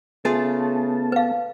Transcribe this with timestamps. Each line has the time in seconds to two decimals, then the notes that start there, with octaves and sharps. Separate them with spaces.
0.25 C#3 A3 B3 F4 G#4 A5
1.12 B4 F5